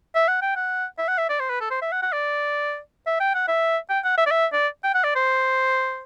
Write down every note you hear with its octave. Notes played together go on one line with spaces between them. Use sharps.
E5
F#5
G5
F#5
E5
F#5
E5
D5
C5
B4
A4
C5
E5
F#5
F#5
D5
E5
G5
F#5
E5
G5
F#5
E5
D5
E5
D5
G5
F#5
D5
C5